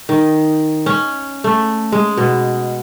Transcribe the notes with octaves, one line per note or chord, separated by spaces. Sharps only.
D#3
C#4
A3
G#3
B2